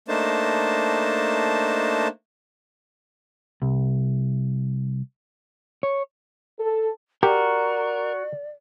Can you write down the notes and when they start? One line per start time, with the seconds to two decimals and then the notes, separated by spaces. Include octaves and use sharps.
0.08 A3 A#3 D4 D#4 C5 A5
3.62 C2
5.83 C#5
6.60 A4
7.23 F#4 G4 A#4 D5